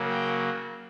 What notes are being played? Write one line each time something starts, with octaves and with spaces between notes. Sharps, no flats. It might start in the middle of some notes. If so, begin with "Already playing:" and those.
Already playing: C#3 F#3 A#3
G5